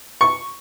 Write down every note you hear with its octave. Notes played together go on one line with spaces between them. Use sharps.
C#6